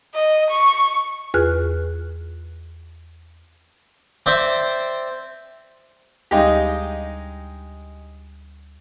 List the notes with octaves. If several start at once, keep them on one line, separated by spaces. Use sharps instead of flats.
D#5
C#6
E2 F4 G#4 B4 F6 F#6
C4 C5 D5 E5
D2 G3 G#3 D#4 G4 F5